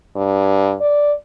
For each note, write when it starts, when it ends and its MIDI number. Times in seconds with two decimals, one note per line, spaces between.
0.16 0.75 43
0.81 1.13 74